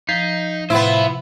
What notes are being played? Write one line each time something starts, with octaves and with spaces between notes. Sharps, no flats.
F3 D#4 G6 B6 C7
A2 C3 B3 E4 F4 C5 B5